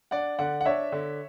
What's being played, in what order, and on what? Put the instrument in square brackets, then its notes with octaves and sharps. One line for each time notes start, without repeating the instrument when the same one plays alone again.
[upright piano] D4 [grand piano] D5 F#5
[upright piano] D3 [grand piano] D5 F#5
[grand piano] F#5
[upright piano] D4 [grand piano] C#5 E5
[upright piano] D3